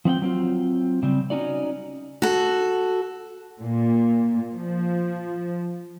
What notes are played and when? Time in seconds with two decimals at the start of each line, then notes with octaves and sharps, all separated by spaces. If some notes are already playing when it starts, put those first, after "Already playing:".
0.05 F3 C4 F#5 G5
0.22 F#3 C4 F4
1.03 C#3 G3 C4
1.30 C#4 D#4 F#4 D5
2.22 F#4 A4
3.61 A#2
4.53 F3